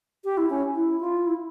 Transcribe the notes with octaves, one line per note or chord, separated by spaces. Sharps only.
G4
E4
C#4
E4
F4
E4